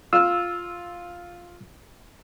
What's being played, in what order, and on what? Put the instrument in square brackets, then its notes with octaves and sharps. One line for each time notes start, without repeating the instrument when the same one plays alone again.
[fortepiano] F4 F6 [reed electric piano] E6